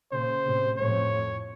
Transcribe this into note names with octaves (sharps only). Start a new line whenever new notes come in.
A#2 C#3 C5
A2 C3
F2 A2 C#5